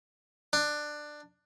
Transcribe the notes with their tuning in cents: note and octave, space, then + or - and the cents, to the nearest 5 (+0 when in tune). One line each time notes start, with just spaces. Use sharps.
D4 +15